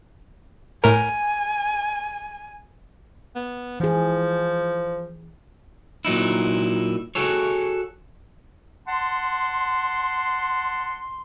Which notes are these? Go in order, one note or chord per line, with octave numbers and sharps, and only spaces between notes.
A2 A#4 G#5
B3
E3 F3 G#4
A#2 F#3 D#4 E4
F#4 G#4 A4 C#5
F#5 A5 C6